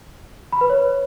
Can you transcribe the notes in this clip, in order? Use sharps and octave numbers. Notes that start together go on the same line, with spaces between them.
B5
B4
C#5